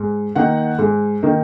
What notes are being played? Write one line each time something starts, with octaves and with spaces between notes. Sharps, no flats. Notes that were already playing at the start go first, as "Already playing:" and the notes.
Already playing: G#2
D#3 A#3 D#4 F#5
G#2
D#3 A#3 D#4